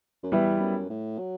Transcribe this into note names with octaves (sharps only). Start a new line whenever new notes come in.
F#2
E2 G3 B3 E4 B4
F#2
A2
F#3